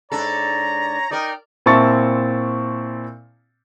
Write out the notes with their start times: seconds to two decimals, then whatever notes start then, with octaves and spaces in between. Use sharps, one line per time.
0.12 G#2 D4 A4 C#5 A#5
1.11 D#4 A#4 D5 D#5 G5
1.66 A#2 C4 E4 A5 C#6 A6